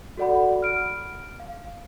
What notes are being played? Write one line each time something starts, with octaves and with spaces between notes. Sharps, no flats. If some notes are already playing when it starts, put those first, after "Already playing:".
F#4 A4 D5 F#5 B5
F6 D7
F5